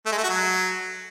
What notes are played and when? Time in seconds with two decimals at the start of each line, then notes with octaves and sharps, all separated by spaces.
0.06 A3
0.12 G#3
0.18 A3
0.23 F#4
0.29 F#3